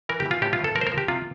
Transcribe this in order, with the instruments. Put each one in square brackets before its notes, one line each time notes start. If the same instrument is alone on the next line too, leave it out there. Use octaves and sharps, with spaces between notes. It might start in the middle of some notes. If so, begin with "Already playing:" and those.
[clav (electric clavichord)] E3 A#4
G4
E3
F4
A2 G4
F4
A2
A4
F3 A#4
C5
A#4
F3
G4
C3 F4